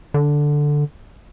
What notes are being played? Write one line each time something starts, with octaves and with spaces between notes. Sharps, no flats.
D3